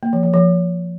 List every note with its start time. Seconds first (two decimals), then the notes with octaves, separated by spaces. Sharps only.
0.03 A#3
0.13 F3
0.23 F3
0.34 F3